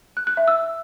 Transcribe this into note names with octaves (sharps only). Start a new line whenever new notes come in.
F#6
F#6
E5
E6